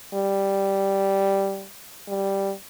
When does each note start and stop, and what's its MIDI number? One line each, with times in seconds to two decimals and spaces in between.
0.14 1.66 55
2.08 2.53 55